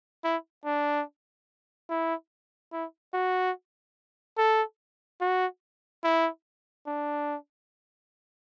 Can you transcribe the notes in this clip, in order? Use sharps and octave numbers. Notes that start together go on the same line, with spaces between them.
E4
D4
E4
E4
F#4
A4
F#4
E4
D4